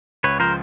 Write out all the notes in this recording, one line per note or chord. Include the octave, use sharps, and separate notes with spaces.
C#2 B4 C#5
F3 A#4 C5